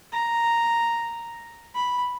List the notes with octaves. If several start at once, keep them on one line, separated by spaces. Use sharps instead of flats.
A#5
B5